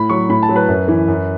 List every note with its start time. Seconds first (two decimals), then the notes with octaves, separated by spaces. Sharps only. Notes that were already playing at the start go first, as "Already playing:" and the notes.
Already playing: A2 B5
0.10 F#3 C#6
0.29 A2 B5
0.43 A5
0.49 F#3
0.56 B4
0.68 F#2
0.88 E3
1.08 F#2